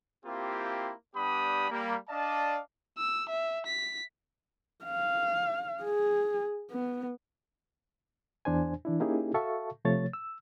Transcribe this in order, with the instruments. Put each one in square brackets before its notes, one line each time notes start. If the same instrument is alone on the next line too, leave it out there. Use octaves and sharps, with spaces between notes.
[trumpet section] A#3 C4 E4 F4 G4
G3 B3 D4 G4 B5 D#6
G3 A#3
D4 D5 D#5 F5 A5
[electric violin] E6
E5
B6
[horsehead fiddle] F5
G#4
B3
[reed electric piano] E2 D4 C5 G#5
E3 D4 E4
A#3 C#4 D#4 E4 G4 G#4
F#4 A4 E5 F5 A5 C#6
C3 F3 A3 C#5 A6
E6